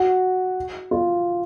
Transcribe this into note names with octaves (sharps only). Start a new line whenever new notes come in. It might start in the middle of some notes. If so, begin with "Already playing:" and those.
Already playing: F#4
F4